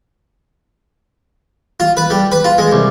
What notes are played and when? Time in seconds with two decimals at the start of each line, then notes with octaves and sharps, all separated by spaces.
1.80 F4
1.97 B4
2.10 G3
2.32 B4
2.44 F4
2.58 G#3
2.72 C2